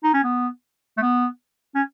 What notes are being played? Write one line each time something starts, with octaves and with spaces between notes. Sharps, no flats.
D#4
C#4
B3
A3
B3
C#4